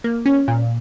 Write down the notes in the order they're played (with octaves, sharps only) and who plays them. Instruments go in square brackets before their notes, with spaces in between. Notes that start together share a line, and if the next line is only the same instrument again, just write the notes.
[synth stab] A#3
C#4
A#2